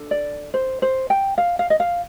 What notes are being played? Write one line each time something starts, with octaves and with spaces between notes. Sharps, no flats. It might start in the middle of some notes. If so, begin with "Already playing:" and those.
Already playing: D4 A4
D5
C5
C5
G5
F5
F5
D#5
F5